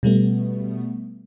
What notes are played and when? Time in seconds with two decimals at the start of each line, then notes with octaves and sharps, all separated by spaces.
0.03 B2 G3 A3 B3